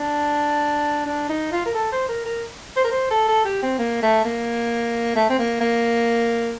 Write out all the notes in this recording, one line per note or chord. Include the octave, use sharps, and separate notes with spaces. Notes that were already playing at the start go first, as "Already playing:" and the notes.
Already playing: D4
D4
D#4
F4
A#4
A4
C5
A#4
A#4
C5
A#4
C5
A4
A4
G4
C4
A#3
A3
A#3
A3
C4
A#3
A#3